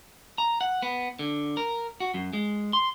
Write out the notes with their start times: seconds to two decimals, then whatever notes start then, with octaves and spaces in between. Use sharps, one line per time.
0.38 A#5
0.61 F#5
0.82 B3
1.19 D3
1.57 A#4
2.00 F#4
2.14 F#2
2.33 G#3
2.73 C6